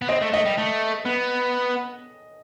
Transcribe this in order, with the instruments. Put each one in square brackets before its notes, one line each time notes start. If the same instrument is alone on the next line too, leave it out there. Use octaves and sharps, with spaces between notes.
[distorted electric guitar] B3
[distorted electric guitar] C4 [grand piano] D#5
[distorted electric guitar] A3
[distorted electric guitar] A3 [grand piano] D#5
[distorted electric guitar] G3
A3
B3